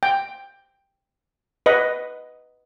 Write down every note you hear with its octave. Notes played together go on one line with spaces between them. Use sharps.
G5
B4 D#5